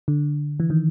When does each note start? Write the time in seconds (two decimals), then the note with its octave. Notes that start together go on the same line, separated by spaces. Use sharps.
0.08 D3
0.60 E3
0.70 D#3